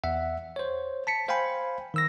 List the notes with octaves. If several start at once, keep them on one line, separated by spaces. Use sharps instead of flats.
E2 E5 F#5
C5 C#5
A5 B6 C#7
C5 F5 G5 G#5 B5
D#3 E6 A#6